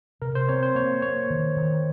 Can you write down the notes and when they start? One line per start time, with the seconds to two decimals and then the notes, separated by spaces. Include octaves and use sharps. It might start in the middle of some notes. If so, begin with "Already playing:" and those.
0.22 C3 A#4
0.35 C5
0.49 C4 C#5
0.63 C5
0.75 A#3 C#5
1.02 A#3 C#5
1.30 D#3
1.56 D#3